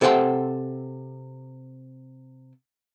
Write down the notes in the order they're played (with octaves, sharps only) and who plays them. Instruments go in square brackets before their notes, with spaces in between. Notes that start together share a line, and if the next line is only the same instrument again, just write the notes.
[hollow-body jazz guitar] C3 A4 C5 F#5 G5 C6